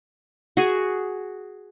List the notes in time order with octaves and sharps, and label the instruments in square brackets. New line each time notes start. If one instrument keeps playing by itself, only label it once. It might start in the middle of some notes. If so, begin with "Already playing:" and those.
[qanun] F#4 G#4